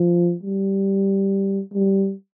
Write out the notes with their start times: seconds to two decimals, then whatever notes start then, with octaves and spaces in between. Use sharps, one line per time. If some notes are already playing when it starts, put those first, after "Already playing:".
Already playing: F3
0.43 G3
1.74 G3